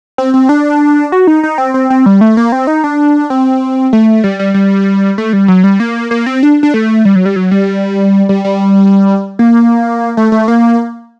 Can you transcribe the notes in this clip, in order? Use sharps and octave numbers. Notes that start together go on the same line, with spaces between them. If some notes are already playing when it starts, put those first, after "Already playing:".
C4
C4
D4
F#4
D#4
D#4
C4
C4
C4
G3
A3
A#3
C4
D#4
D4
C4
A3
G3
G3
G3
A3
G3
F#3
G3
A#3
A#3
C4
D4
D4
A3
G3
F#3
G3
F#3
G3
G3
G3
A#3
A3
A3
A#3